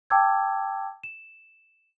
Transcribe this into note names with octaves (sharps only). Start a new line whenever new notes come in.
G5 A5 D6 E6 G#6
E7